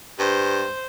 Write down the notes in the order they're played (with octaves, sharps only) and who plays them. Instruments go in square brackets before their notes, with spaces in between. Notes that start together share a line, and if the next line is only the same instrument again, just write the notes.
[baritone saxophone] G2 [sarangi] C5